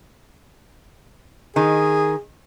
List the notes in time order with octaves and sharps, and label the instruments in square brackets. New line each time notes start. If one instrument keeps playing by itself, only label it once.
[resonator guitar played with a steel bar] D#3 [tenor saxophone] G#4